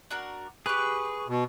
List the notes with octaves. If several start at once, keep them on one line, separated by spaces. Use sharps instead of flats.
D4 F#4 A#4
G4 G#4 B4 C#6 F#6
B2